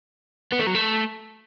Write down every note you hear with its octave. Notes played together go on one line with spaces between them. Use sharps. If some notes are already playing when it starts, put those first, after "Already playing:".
B3
A3
F#3
A3